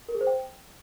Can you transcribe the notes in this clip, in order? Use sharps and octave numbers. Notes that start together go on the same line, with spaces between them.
A#4
G#4
C5
G5